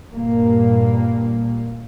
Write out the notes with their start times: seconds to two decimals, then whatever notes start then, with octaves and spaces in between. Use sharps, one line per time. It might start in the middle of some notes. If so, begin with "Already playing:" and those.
0.12 G2 A#2 A#3